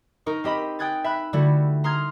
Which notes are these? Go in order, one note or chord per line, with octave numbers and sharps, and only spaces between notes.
D#4 A#4 C#6
C4 G4 D#5 B5
G5 D#6 F#6 G#6 A6
E5 B5 F#6
D3 G3 A3 E4 F#4
A#5 C6 D#6 F6 G#6